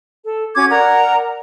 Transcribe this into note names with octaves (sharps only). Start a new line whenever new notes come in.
A4
C#4 F#4 D6 G#6
A#4 D5 F#5 A#5